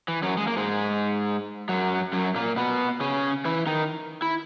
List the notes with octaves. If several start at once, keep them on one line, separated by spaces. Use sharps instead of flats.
E3
F#2 F#3
G#3
A#3
G#2 G#3
F#2 F#3
F#2 F#3
A#2 A#3
B2 B3
C#3 C#4
E3 E4
D#3 D#4
E4